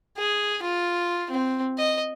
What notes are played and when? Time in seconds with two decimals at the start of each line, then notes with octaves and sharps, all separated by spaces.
0.18 G#4
0.63 F4
1.31 C4
1.78 D#5